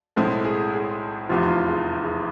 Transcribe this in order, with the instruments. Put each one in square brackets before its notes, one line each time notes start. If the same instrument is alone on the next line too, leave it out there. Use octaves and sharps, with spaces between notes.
[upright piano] B1 A2 G#3 C4 E4 [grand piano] A4
[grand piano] G#4
G#4
[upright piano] F1 E2 C3 F3 [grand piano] F4
[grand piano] F4
G#4
G#4